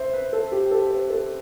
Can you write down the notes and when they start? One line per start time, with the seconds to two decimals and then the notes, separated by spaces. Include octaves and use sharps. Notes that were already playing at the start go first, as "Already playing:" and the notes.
Already playing: C5 E5
0.14 B4
0.33 A4
0.52 G4
0.71 A4
0.91 C5
1.10 A4